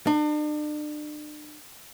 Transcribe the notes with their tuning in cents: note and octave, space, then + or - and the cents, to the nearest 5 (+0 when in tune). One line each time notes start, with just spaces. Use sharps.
D4 +40